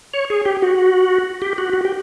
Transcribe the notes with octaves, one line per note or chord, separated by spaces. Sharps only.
C#5
G#4
G4
F#4
G4
F#4
F#4
G4